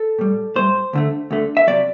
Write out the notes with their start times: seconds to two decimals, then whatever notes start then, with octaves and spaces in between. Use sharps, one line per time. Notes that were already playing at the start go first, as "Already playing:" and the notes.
Already playing: A4
0.19 A2 G3
0.56 A2 G3 C5
0.93 D2 D3 A3
1.31 D2 D3 A3
1.57 E5
1.67 C3 F#3 D5